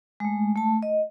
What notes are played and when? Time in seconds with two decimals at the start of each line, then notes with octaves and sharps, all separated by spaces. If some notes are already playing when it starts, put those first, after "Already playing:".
0.20 G#3 A3
0.56 A3 A5
0.83 D#5